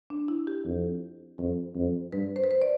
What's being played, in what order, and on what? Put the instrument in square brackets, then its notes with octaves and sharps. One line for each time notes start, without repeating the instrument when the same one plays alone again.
[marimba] D4
E4
G4
[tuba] F2
F2
F2
[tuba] G2 [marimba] B4
[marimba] C5
B4
C5
D5